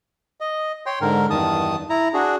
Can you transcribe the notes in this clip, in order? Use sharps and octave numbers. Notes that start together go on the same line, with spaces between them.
D#5
C#5 G5 C6
G#2 D3 A#4
E2 G2 D#3 A5 D#6
E4 A#5
D4 F#4 G#4